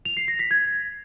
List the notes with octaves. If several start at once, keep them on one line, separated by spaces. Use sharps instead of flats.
F7
C7
A#6
B6
G#6